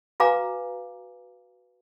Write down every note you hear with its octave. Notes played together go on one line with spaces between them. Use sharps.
F#4 B4 F5 G#5 A#5 D6